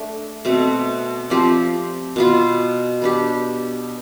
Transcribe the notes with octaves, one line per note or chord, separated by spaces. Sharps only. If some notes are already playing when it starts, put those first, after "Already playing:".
Already playing: A3 D4 A4
B2 A3 C4
F3 C4 G4 D5
B2 B3 F4
B3 D4 G4